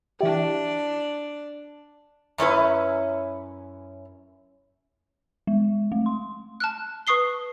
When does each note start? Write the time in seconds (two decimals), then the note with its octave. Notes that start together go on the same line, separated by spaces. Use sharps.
0.21 E3 D4 E4 G4 D5
2.38 F#2 C#4 E4 B4
5.47 G#3
5.92 A3
6.06 C6
6.60 A5 F6 F#6
7.07 B4 C#6 D#6 C7 G7